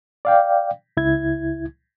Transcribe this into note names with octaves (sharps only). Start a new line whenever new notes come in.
D5 F5 G5
C#2 E4 G#6